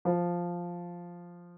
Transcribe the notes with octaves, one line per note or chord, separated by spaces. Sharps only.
F3